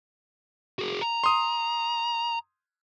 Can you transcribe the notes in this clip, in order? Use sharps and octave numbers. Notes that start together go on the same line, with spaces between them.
F#4 G#4
A#5
C6 D#6